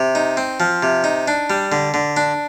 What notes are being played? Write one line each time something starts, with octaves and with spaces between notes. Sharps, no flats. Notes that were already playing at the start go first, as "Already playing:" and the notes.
Already playing: C3
D#4
C4
F3
C3
D#4
D4
G3
D3
D3
D4